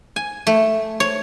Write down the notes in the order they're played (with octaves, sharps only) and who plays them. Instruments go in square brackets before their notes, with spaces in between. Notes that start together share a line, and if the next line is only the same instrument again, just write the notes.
[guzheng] G#5
A3
C#5